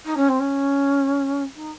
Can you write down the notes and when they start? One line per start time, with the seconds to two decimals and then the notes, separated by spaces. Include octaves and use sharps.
0.05 D#4
0.17 C#4
0.28 C4
0.39 C#4
1.55 D#4